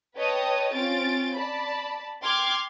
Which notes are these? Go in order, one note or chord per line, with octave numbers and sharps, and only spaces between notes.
B4 C#5 D#5 G5 A5 D#6
C4 C#4 F4 A6 D7
D5 A5 B5
G5 C6 D6 F6 G#6